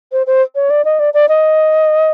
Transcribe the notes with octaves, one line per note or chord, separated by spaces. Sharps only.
C5
C5
C#5
D5
D#5
D5
D5
D#5